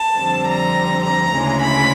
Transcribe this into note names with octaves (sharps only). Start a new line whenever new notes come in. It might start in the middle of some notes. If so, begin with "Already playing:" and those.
Already playing: A5
F2 D3 G3 C4
A#5
A#5
D2 C#3 E3 G#3
B5